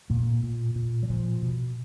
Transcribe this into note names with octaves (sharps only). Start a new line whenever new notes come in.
A#2 A3
A#2
A#2
F#3
A#2 F3
B2